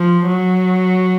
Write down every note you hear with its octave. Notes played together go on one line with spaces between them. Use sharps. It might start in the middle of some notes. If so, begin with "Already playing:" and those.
Already playing: F3
F#3